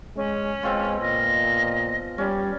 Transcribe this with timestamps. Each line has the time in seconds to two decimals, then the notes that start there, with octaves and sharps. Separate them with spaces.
0.16 G#3 C#4
0.63 B2 G#3 C4 F4
1.01 A#2 D#5
2.18 G3 C#4 D5